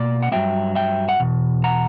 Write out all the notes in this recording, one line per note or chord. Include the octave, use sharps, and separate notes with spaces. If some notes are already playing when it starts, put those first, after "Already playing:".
Already playing: B2 A#3 D5
F#5
G2 F#3 A#3 E5 G5
E5 G5
F#5
E2 B2
F#5 A#5